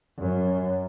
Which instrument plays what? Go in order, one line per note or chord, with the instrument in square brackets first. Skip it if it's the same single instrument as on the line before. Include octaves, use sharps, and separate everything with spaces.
[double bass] F#2